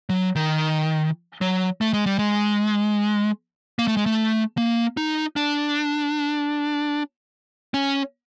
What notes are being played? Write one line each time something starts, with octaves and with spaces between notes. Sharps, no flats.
F#3
D#3
F#3
A3
G#3
G3
G#3
A#3
A3
G#3
A3
A#3
D#4
D4
C#4